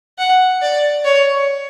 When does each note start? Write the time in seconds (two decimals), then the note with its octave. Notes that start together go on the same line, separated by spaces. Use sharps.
0.18 F#5
0.62 D5
1.04 C#5